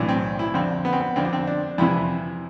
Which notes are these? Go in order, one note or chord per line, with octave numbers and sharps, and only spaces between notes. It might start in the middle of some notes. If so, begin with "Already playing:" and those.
Already playing: B1 A2 E3 D4
C4
E4
F2 D3 C4
B3
C4
B3
F2 D3 C4
D4
C4
D4
F2 C3 E3 E4